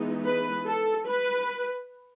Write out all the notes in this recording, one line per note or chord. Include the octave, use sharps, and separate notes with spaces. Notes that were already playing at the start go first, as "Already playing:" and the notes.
Already playing: E3 G#3 B3 D#4
B4
A4
B4